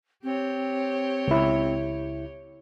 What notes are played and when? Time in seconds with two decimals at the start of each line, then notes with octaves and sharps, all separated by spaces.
0.24 C4 G4 C#5
1.28 C#2 E4